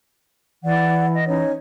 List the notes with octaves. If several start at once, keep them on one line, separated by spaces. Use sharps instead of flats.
E3 D5 F#5
D#5
C#4 D#4 C#5